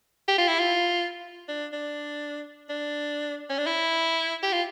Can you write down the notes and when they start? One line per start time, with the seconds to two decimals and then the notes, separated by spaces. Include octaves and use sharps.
0.28 G4
0.38 F4
0.48 E4
0.59 F4
1.48 D4
1.72 D4
2.69 D4
3.50 C#4
3.58 D4
3.66 E4
4.43 G4
4.53 F4